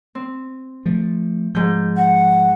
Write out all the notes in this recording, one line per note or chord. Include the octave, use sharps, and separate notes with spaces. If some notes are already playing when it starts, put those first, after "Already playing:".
C4
F3 A3
G#2 F3 G6
F#5